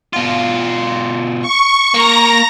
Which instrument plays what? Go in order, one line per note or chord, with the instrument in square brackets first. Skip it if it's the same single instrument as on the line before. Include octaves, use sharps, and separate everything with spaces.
[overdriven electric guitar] B2 F4
[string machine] C#6
[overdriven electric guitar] A#3 [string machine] A#5 A#6